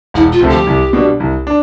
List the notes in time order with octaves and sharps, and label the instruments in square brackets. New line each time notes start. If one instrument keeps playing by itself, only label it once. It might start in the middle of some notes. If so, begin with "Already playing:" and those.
[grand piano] E1 [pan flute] E4
[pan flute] F4
[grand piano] D2 C3 F3 A3
[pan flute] G4
[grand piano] C2
B2 G3 D4
C2
D4